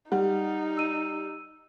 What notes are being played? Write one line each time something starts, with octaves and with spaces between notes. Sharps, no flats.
G3 D#4 F#5
E6 D#7